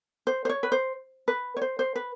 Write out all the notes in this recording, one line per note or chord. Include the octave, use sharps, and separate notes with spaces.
C5
C5
C#5
B4
C5
B4
C#5
C5
C5
B4